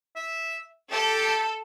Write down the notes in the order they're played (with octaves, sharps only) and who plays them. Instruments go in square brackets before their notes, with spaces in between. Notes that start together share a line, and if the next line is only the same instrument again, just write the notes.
[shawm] E5
[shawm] G4 [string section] A4